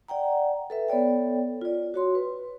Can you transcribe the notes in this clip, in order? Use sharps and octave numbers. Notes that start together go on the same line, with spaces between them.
D5 F#5 G5 A#5
A4 B4 E5
B3 A4 C#5 D5 G5
F4 D5
F#4 C#5 C6
B4